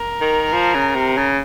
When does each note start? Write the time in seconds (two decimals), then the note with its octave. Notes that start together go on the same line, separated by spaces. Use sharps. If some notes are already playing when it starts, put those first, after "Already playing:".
Already playing: A#4
0.21 D#3
0.53 F3
0.75 C#3
0.96 C3
1.17 C#3